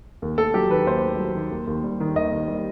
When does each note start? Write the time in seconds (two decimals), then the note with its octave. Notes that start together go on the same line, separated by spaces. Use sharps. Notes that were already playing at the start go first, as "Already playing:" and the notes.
0.22 D#2
0.38 A3 A4
0.54 F#3 G4
0.70 D#3 B4
0.87 D#2 C5
1.03 A3
1.19 F#3
1.35 D#3
1.51 D#2
1.67 D#2
1.83 G3
2.00 D#3
2.16 D#2 D#5
2.32 D#2
2.48 G3